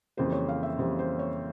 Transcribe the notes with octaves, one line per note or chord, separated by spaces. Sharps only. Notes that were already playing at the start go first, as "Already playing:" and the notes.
F2 C#3 E3 G3 A#3 C5
C#5
F5
E5
F2 C#3 E3 G3 A#3 C5
C5
C#5